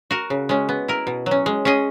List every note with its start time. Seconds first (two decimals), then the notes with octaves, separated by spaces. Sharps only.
0.11 F#4 A#4
0.30 C#3
0.49 G#3 C#4
0.69 B3
0.88 E4 A#4
1.07 B2
1.26 F#3
1.31 C#4
1.46 G#3
1.65 C#4 G#4 D#5